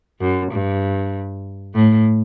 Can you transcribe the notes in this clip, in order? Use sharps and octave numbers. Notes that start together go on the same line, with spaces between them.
F#2
G2
A2